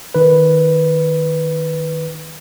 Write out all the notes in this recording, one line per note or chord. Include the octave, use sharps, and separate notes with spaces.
D#3 B4